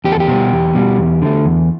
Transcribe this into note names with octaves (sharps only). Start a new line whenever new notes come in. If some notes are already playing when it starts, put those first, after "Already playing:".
E2 G4
A4
G4
B2 G3
E2
B2 G3
E2
D3 A3
E2